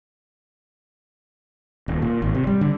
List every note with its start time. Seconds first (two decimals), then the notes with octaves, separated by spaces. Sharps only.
1.88 D#1
2.02 A#2
2.22 G#1
2.35 C3
2.47 G3
2.61 D3